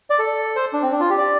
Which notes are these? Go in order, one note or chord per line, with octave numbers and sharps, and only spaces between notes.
D5
A4
C5
D4
C4
D4
F4
G4
D5